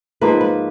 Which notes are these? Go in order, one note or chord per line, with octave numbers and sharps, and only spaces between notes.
G#2 F3 A#3 B4
B4